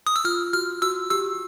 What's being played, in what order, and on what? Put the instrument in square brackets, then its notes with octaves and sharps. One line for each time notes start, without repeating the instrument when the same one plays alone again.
[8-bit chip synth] D#6
E6
[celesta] F4 [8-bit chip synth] F6
[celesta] F#4 [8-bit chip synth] F6
[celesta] F#4 [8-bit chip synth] E6
[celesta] G4 [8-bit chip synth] E6